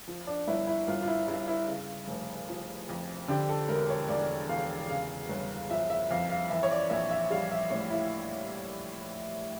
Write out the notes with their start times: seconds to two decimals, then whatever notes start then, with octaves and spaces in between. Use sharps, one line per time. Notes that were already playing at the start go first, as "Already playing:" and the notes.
0.08 F3
0.27 D4
0.48 G1 E4
0.67 E4
0.87 G1 F4
1.02 F4
1.08 E4
1.28 G2 E4
1.48 E4
1.67 C#3
2.08 F1
2.49 F3
2.89 F2
3.28 D3 G4
3.49 A4
3.68 E1 A#4
3.90 C#5
4.09 E1 D5
4.49 E2 F5
4.89 C#3 F5
5.29 G1
5.70 F3 E5
5.90 E5
6.10 F2 F5
6.30 F5
6.50 E3 E5
6.63 C#5
6.71 D5
6.90 A#1 E5
7.10 E5
7.31 G3 F5
7.51 E5
7.70 A2 C#5
7.90 E4